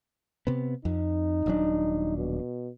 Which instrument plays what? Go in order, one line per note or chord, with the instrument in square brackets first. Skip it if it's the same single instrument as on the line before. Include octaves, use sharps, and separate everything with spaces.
[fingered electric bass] C3 B3
[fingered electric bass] F2 [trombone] D#4
[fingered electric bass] D#1 F#3 D4
[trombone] B2